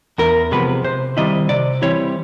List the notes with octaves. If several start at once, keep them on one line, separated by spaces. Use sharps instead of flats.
E2 A#4
C3 F3 G#3 B3 B4
C3 C5
D#3 G3 C4 E4 D#5
C3 D5
E3 G3 C4 E4 C#5